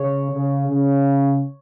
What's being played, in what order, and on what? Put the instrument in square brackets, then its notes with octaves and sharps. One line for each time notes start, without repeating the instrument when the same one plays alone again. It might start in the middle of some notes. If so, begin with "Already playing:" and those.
Already playing: [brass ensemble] C#3 [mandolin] C#5
[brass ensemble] C#3
C#3